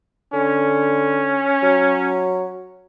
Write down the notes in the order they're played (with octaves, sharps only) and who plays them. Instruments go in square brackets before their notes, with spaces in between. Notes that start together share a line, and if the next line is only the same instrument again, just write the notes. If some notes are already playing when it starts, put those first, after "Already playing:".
[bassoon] D3 [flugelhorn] C#4
[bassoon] F#3